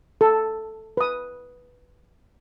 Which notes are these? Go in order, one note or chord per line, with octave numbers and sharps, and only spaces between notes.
A4
B4 D#6